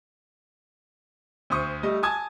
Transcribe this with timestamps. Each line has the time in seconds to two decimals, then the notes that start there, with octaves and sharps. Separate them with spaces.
1.50 D2 C5 C#6 D#6
1.83 G3 A3 D#5
2.03 G#5 A5 D#6 G#6